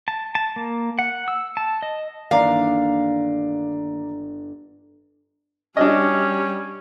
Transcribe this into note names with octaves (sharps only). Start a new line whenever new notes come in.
A5
A5
A#3
F#5
E6
A5
D#5
G1 D#3 E3 A#3 D4 D5 F5 A#5
G3 C#4 D4 F#4 D#5